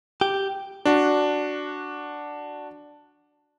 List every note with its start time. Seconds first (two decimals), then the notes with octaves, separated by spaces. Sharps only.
0.21 G4
0.85 D4 F#4